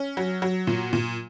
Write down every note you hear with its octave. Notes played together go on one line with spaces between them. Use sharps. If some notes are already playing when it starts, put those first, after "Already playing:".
Already playing: C#4
F#3
F#3
A#2
A#2